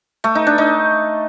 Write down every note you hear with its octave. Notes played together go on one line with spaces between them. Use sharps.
A3
D#4
D4
D#4